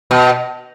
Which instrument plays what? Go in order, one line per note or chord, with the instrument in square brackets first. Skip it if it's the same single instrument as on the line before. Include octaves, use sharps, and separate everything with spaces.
[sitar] B2